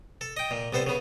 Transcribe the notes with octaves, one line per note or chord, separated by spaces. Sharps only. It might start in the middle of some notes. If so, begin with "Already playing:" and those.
A4
D#5 G5
A#2
C2 B3 A4 C5
C#3 B3